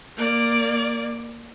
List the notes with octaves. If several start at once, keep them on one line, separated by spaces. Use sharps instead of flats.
A#3 D5